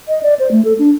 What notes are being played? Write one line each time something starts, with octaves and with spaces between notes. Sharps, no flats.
D#5
D5
C5
A3
A4
D4